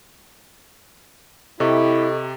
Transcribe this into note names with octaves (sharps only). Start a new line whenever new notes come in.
C3 E4 G4 A4 D#5 C#6